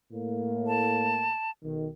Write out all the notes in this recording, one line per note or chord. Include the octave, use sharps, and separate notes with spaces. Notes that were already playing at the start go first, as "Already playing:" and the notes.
A2 A#3
A5
B1 D#3